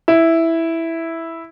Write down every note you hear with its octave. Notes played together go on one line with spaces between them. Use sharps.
E4